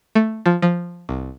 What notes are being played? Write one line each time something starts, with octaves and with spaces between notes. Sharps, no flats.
A3
F3
F3
C2